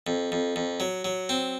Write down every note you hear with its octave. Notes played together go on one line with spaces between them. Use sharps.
F2
F2
F2
F#3
F#3
C4